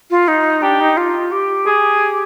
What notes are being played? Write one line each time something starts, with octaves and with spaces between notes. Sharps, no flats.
F4
D#4
D4 G4
D#4
F4
G4
G#4